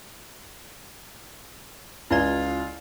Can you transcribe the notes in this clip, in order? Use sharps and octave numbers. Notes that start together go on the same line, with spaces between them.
C#2 E4 F4 D5